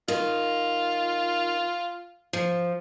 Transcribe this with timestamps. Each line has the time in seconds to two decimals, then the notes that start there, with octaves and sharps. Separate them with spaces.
0.08 D#3 F4
2.33 F3